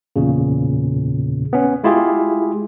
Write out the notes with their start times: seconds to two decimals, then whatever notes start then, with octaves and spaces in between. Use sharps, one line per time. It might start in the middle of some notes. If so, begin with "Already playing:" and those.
0.16 E2 A#2 C#3
1.53 B3 C#4
1.84 G#3 E4 F4 G4 G#4